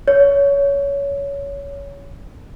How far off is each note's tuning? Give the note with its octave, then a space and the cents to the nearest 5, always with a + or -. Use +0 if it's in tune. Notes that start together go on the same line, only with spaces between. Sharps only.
C#5 +20